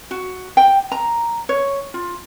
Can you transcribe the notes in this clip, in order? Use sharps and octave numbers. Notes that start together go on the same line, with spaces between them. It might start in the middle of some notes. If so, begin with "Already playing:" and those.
F#4
G5
A#5
C#5
F4